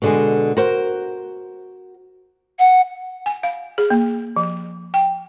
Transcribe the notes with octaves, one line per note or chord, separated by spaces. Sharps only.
B2 D3 G#3
F#4 A#4 C5
F#5
G#5
F5
G#4
A#3
F3
G5